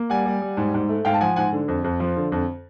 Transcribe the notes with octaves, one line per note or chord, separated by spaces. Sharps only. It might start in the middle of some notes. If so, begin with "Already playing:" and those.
Already playing: A#3
G3 F#5 G#5
G3
G3
G#2
G#2
A3
G#2 F5 G5
A5
F3 F#5 G#5
G#2 F#5 G#5
D3
F2
F2
F3
D3
F2